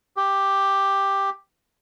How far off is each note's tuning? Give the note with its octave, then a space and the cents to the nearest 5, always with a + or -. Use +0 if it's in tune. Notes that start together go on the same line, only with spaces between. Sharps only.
G4 +5